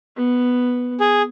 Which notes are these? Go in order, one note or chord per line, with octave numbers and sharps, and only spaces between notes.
B3
G#4